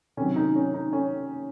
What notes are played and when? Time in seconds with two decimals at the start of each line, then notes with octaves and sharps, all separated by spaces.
0.17 C3 D#3 F#3 C#4
0.36 D#4
0.55 C#4
0.74 D#4
0.93 C#4